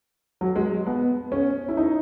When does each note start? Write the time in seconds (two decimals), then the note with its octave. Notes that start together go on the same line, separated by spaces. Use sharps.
0.41 F#3
0.56 G#3
0.87 B3
1.32 C#4
1.69 E4
1.77 D#4